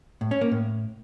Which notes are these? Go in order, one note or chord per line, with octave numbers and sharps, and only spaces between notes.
A2
C#4
A#3
A2